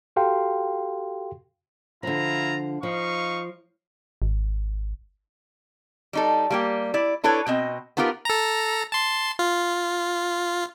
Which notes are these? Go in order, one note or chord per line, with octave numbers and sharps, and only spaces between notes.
F#4 G4 A4 F5 G5 C6
D3 F3 E4 F4 A#5
F3 D#4 F5 C#6
G#1
G3 D#4 A4
G3 A#3 G4
E4 D5
D4 E4 A4 B4 C#5
B2 C4 D#5
B3 D#4 F4 G4 A#4
A4 A#5
A5 C6
F4